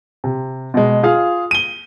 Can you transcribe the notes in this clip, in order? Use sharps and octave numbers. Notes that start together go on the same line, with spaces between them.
C3
B2 G#3
F4 G#4 F5
D#7 G7